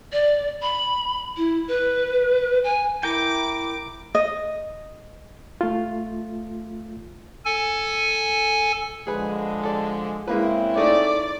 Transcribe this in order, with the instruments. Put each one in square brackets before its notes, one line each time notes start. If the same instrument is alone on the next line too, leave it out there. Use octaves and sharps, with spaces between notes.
[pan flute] D5
B5
E4
B4
G#5
[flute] E4 [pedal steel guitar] A#4 G5 [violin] D6
[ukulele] D#5
[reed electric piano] A3 F4
[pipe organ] A4 G#5
[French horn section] D3 F3 G#3 [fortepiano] G#4 B4
[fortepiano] A4 D5
[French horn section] C#3 C4 E4 [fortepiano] G#3 A#3 B4
[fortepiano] A3 D#4 [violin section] D5